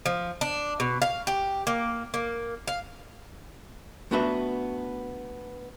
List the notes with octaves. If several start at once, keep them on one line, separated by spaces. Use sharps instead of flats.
F3
D4
B2
F5
G4
A#3
A#3
F5
A3 B3 D4 F#4 B4 E5